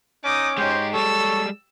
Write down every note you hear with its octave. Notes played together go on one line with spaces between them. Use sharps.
C#4 D#4 D6 D#6
G#3 D#4 G4 C5 C#5
G3 G#3 A4 C#5 E6